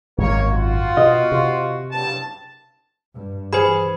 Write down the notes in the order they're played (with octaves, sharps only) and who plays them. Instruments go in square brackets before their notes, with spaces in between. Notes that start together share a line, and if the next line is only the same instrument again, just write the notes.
[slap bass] G#1 F#2 [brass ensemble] A#3 C#5
[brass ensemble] F4 F#4
[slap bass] B2 [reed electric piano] D#5
[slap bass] C3
[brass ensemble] F#1 G2 A5
[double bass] G2
[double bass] E3 [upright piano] G#4 [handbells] C5 B5